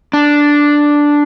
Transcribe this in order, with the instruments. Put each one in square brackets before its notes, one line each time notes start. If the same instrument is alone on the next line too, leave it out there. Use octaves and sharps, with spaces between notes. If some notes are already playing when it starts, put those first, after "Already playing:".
[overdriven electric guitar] D4